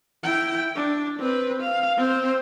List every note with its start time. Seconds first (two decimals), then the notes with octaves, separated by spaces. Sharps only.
0.23 E4 G5
0.76 D4
1.19 C4 B4
1.61 F5
1.97 C4 C5